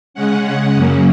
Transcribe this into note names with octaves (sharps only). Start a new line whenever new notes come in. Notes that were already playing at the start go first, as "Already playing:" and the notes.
C#3 G#3 C#4 F#5
F#2 C#3 F#3 A#3 C#4